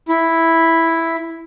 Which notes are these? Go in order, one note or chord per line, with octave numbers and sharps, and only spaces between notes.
E4